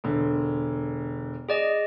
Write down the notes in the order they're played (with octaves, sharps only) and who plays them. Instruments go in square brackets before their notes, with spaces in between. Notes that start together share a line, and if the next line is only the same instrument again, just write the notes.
[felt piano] E1 D3
[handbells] G#4 D5 D#5